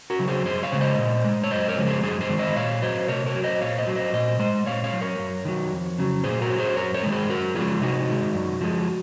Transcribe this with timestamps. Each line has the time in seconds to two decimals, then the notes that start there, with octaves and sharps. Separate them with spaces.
0.10 F#4 A#4
0.19 C#3 F#3
0.28 G#4 C5
0.45 F#2 G#4 C5
0.63 C#5 F5
0.72 C#3 G#3
0.81 C5 D#5
0.98 A#2
1.24 G#3
1.44 C#5
1.51 F#2 C5 D#5
1.68 A#4 C#5
1.77 C#3 F3 G#3
1.86 G#4 C5
2.03 F#2 G#4 C5
2.21 G#4 C5
2.29 D#3 G#3
2.38 C5 D#5
2.55 A#2 C#5 F5
2.82 F#3 C5 D#5
3.08 C3 A#4 C#5
3.26 A#4 C#5
3.35 F#3
3.43 C5 D#5
3.61 A#2 C#5 F5
3.78 C5 D#5
3.87 F#3
3.96 C5 D#5
4.13 A#2 C5 D#5
4.39 G#3 C5 D#5
4.66 A#2 C#5 F5
4.84 C#5 F5
4.93 F#3
5.01 A#4 C#5
5.19 F#2
5.45 D#3 F#3
5.72 F2
5.98 C#3 F#3
6.24 A#2 G#4 C5
6.42 F#4 A#4
6.50 F#3
6.59 G#4 C5
6.76 F#2 A#4 C#5
6.94 A#4 C#5
7.03 D#3 G#3
7.12 G#4 C5
7.29 F#2 F#4 A#4
7.55 F3 G#3 F4 G#4
7.82 C3 D#4 F#4
8.08 D#3 G#3
8.35 F#2
8.61 F3 G#3